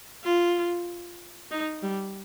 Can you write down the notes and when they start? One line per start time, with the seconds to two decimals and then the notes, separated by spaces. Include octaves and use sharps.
0.24 F4
1.51 D#4
1.83 G3